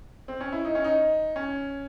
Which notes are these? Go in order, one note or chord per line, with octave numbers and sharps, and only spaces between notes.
C4
C#4
E4
D#4
C#4
D#4
C#4